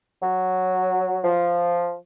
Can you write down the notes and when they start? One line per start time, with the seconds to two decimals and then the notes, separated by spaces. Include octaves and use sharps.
0.22 F#3
1.24 F3